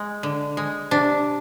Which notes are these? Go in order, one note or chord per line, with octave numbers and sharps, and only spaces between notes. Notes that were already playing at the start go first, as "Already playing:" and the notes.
Already playing: G#3
D3
G#3
C3 D4